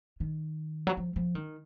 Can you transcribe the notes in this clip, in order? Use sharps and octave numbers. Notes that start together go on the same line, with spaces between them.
D#3
F#3
F3
F3
D#3